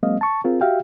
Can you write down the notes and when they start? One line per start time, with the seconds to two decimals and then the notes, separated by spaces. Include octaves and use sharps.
0.03 F#3 G#3 A#3 C4 D#5 F5
0.21 A5 C#6
0.44 C4 F4 G#4 A#4
0.61 F#4 G4 E5 F5 G5